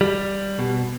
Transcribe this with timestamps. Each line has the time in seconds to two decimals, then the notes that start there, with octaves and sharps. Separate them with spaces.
0.01 G3
0.59 B2